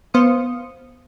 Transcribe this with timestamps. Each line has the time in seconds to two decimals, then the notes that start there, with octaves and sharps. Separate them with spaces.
0.14 B3 C5 F5 D#6 C#7